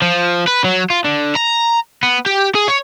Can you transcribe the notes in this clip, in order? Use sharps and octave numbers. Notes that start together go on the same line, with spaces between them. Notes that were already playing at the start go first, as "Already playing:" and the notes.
F3
B4
F#3
F4
D3
A#5
B3
G4
G#4
C#5